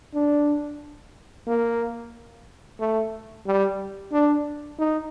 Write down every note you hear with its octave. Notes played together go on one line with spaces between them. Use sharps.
D4
A#3
A3
G3
D4
D#4